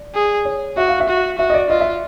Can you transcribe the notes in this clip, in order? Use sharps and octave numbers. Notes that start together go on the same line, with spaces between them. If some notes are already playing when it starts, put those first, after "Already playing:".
Already playing: D5
G#4
C#5
F#4 E5
F5
E5
F#4
F#4 E5
D#5
D5
F4 D#5
E5